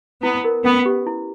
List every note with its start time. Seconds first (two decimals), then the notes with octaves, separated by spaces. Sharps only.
0.23 B3 E4
0.44 A#4
0.64 B3 C#4
0.86 G4
1.07 E4